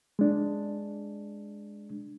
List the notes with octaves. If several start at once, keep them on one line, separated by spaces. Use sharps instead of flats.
G#3 D4